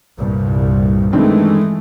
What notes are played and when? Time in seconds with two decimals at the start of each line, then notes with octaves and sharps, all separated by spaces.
0.17 C2 G2 A#2
1.13 G2 D#3 E3 G#3 A3 C4